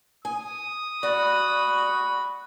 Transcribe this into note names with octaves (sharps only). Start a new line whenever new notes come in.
G#5 D#6
F#4 D5 B5